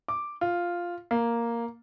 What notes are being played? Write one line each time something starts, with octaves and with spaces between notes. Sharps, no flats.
D6
F4
A#3